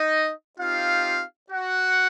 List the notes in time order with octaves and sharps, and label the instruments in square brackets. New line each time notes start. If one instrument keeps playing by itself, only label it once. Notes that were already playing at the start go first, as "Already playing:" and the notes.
Already playing: [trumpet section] D#4 D#5
C4 D#4 F4 G4 F5
F#4 F#5